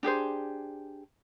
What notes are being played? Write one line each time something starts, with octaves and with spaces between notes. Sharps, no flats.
D4 G4 G#4 C5